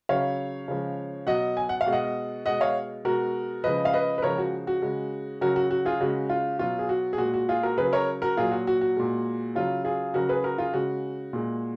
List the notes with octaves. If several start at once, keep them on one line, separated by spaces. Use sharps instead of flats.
C#3 F#3 C#5 F5
C#3 F3 G#3
B2 F#3 D#5 F#5
G#5
F#5
F5
B2 G#3
D#5 F#5
B2 G#3 D#5 F#5
C#5 F5
B2 G#3 F#4 A#4
C#3 F3 G#3 B4 D#5
F5
B4 D#5
B4
C#3 F3 G#3 A#4 C#5
F#4
F#4
C#3 G#3
C#3 F#3 F#4 A#4
F#4
F#4
F4 G#4
C#3 G#3 F#4
F4
B2 F#3 F4
G#4
F#4
G#4
A#2 G#3 F#4
F#4
F4 G#4
F#4 A#4
C#3 F#3 G#4 B4
A#4 C#5
F#4 A#4
A#2 F#3 F4 G#4
F#4
F#4
F#4
A#2 G#3
C#3 F#3 F4
F4 G#4
C#3 F#3 F#4 A#4
G#4 B4
F#4 A#4
F4 G#4
C#3 G#3 F#4
A#2 G#3